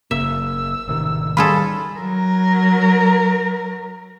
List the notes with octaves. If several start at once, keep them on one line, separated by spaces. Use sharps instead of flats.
F#1 C#3 A#3 E5 E6
A1 C3 D#3
D#3 G3 F4 G#4 A4 B5
F#3 A#4